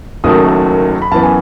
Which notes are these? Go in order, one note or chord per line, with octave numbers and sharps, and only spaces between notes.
F#1 F#2 D#3 F#3 A3 D#6
B5
F#2 E3 B3 A5
G#5